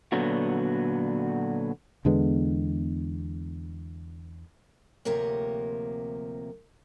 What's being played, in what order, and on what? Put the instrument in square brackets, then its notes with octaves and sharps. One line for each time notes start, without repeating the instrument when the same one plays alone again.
[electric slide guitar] A#2 D3 F#3 B3 F#4
[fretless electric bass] E2 D3 G#3 B3
[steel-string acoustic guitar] D2 C3 F3 A#3 A#4 C#5